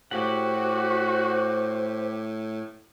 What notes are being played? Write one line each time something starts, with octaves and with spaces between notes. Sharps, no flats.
A2 F#4 G4 C5 F#5